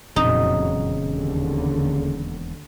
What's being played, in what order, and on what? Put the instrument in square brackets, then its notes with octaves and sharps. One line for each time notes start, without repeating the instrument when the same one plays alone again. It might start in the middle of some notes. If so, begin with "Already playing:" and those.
[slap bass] E1 C4 [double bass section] F2 A#2 F#3 [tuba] C#3 [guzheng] D#4
[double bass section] D#2 D3